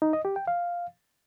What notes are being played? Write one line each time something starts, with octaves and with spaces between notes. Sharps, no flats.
D#4
D#5
G4
G5
F5